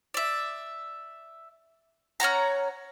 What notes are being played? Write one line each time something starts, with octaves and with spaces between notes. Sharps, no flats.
D5 E5
C#4 C#5 F#5 A#5